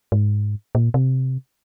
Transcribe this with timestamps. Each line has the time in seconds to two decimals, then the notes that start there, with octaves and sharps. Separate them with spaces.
0.12 G#2
0.75 A#2
0.94 C3